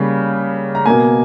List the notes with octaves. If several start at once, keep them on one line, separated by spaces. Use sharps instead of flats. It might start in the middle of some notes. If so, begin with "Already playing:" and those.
Already playing: C#3 G3 A#3
A#5
B2 A#3 G#5